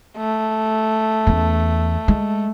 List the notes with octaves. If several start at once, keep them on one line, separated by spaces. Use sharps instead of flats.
A3
E2 C#4
G#3